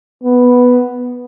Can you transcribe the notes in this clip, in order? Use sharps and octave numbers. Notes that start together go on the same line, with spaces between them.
B3